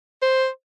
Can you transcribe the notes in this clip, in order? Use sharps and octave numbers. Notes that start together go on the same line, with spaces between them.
C5